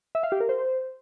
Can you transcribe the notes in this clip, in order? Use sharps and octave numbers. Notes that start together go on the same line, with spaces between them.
E5
F5
G4
A#4
C5